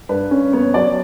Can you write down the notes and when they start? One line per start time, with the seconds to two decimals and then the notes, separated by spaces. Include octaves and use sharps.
0.09 G2 B4
0.31 C#4
0.53 B3 C#5
0.74 F#3 D5